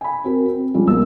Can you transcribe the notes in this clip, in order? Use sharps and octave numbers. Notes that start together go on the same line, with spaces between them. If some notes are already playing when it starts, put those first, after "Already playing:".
G#5 B5
C4 F#4 A#4
C4
F3 G3 G#3 C#4
B1 A#3 E6